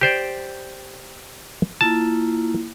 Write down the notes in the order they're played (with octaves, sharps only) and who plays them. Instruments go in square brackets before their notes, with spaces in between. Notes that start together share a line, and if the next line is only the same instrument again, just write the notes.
[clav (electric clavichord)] G4 C5 D5
[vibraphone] A#3 E4 F4 [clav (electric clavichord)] A5